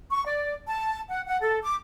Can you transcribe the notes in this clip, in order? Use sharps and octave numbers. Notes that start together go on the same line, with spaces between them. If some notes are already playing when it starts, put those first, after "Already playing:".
C#6
D5
A5
F#5
F#5
A4
D6